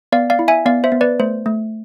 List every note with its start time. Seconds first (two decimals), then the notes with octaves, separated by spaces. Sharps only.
0.12 B3 D5 F5
0.30 D5 F5
0.39 E4
0.48 E5 G#5
0.66 B3 D5 F5
0.84 C5 E5
0.92 B3
1.01 B4 D5
1.19 A3 C5
1.46 A3